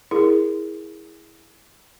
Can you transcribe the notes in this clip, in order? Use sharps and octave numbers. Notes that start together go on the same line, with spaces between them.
E4 G#4 A#4